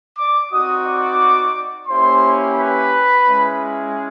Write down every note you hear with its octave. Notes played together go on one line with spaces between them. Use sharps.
D5 D6
C4 D#4 F#4 D#5 D#6
D5 D6
A#3 C#4 E4 G4 C5 C6
B4 B5
G#3 C#4 E4